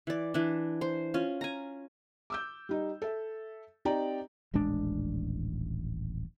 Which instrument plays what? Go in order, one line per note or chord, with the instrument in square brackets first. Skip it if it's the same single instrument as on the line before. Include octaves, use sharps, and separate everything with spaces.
[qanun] E3 D5
E3 D4
C5
C#4 F4
G#5 A#5
[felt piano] D6 E6 G6
G3 D#4
A4 E5
C4 D#4 G4 D5 G5 A#5
[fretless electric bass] D#1 A1 G#3 D4